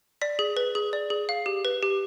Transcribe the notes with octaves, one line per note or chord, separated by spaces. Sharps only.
D5 B6
G#4
B4
G#4
D5
G#4
F5
G4
B4
G4